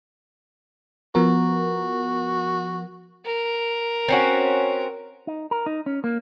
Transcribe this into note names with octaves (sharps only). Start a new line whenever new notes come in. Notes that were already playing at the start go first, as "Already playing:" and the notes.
F3 B3 F#4 A#4
A#4
C4 C#4 F#4
D#4
A#4
D#4
C#4
A#3